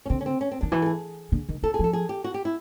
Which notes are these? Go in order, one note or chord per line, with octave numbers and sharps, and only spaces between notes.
C#4
D3 C4
C#4
C4
C#4
C4
D#3 D4
E3 F#4
A4
G#4
D3
D#3
E3 A4
G#4
F3 A4
G#4
G4
F#4
G4
E4